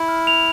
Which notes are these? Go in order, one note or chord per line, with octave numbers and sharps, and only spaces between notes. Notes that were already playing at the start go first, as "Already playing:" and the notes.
Already playing: E4
F6
F7